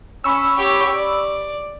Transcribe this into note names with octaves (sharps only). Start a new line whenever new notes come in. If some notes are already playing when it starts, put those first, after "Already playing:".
C#4 B5 C#6 E6
G4 C#5
D5